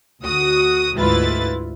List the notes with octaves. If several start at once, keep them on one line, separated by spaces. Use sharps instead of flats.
D2 F#4 D#6
D2 G#2 E4 F4 B4 A6